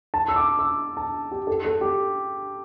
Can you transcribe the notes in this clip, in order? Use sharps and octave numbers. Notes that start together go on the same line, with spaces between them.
A5
E6
D6
E6
A5
G4
A4
A4
G4